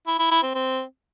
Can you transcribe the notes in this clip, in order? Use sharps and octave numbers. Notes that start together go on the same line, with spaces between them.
E4
E4
E4
C4
C4